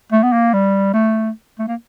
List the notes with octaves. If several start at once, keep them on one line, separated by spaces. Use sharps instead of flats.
A3
B3
A#3
G3
A3
A3
A#3